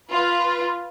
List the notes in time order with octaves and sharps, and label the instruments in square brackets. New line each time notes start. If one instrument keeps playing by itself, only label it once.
[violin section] F4 B4